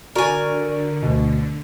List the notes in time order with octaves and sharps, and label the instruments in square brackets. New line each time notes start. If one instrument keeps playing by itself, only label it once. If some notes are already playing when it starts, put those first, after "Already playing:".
[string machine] D3 [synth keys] F#4 D5 [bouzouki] A#4 G#5
[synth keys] D2 B2